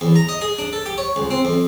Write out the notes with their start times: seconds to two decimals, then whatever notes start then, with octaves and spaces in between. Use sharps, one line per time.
0.01 E2
0.16 A#5
0.29 D#5
0.41 G#4
0.58 D4
0.73 A4
0.86 G4
0.98 C#5
1.16 C#2
1.31 C4
1.45 F2